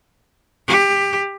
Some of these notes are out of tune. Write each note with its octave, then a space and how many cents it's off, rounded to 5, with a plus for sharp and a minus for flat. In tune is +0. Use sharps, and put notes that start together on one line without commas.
G4 +20